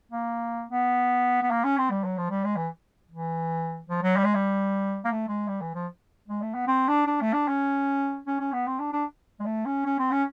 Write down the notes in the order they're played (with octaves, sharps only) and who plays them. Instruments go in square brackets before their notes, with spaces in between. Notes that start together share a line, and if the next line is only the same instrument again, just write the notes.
[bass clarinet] A#3
B3
B3
A#3
C#4
C4
G3
F#3
F3
G3
G#3
E3
E3
F3
F#3
G3
G#3
G3
A#3
A3
G#3
G3
E3
F3
G#3
A3
B3
C4
D4
D4
A3
D4
C#4
C#4
C#4
B3
C4
D4
D4
G#3
A3
C#4
C#4
C4
C#4